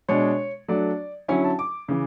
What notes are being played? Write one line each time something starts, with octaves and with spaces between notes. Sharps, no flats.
B2 G#3 D4 C#5
F#3 A3 D4 D5
D3 F#3 C#4 E4 G#5
A5
D6
C#3 E3